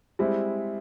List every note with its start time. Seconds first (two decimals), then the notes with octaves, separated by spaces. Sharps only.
0.19 G3 G#3 C4 E4